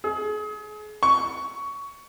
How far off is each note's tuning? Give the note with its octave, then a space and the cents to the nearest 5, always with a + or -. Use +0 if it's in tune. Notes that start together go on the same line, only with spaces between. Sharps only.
G#4 +35
C#6 +15